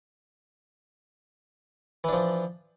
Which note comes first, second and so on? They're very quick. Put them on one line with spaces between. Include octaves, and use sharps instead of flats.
E3 D4 F3